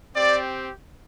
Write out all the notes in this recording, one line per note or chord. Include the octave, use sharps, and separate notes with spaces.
C4 G4 D5